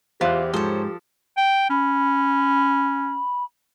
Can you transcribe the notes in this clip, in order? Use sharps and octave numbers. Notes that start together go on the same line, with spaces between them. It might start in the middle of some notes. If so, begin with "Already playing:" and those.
E2 F4 G4 C5 E5 F#6
G#2 F3 A4 C5 C#5
G5
C#4 B5